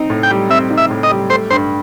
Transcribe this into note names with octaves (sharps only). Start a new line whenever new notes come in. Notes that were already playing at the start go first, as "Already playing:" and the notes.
Already playing: C4 D#4
A2
G5
G3
C4 E5
D#4
E5
A2
D#5
G3
A3 C5
G2 C5